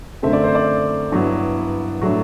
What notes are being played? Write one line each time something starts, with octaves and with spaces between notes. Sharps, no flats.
F#2 D3 A3 C4 E5
D5
C5
D5
G2 F#3 B3 E4
A2 F#3 A3 D4